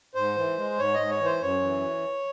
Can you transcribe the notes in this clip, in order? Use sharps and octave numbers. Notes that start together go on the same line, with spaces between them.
G#2 C5
E3
G#3
G#2 C#5
D#5
G#2
C#5
E3
C5
F#2 C#5
E3